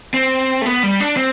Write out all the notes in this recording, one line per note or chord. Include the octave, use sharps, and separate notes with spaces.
C4
A3
B3
G3
D4
C4